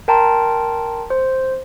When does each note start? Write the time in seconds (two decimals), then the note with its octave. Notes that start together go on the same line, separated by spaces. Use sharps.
0.08 A#4 G5 A5 A#5 C6
1.10 C5